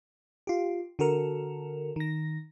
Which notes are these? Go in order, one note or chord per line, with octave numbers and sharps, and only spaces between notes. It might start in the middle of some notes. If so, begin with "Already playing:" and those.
F4 G4
D3 F#4 A4 A#4
D#3 A#6